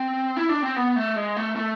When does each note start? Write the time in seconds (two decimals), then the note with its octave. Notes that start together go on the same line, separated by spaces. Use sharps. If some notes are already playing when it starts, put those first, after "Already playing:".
Already playing: C4
0.37 E4
0.49 D4
0.62 C4
0.76 B3
0.96 A3
1.16 G#3
1.37 A3
1.56 A3